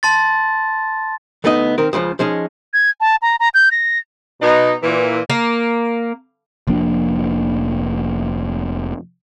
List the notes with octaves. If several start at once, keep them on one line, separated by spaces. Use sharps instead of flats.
A5 C6 A6
D2 A3 B3 D#4 D#5
D#3 C4 A#4
C#2 C#3 E3 F3
F3 G#3 C#4 D#4
G#6
A5
A#5
A#5
G6
A#6
B2 D#4
A#2 E3
A#3
F1 F3 A#3 D4